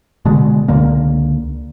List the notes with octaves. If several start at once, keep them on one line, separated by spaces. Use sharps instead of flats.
B2 D3 G#3
C#2 D3 A#3